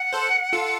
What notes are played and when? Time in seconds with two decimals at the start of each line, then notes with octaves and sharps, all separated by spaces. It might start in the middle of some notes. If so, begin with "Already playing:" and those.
Already playing: F#5
0.13 A4 C5
0.53 F4 A4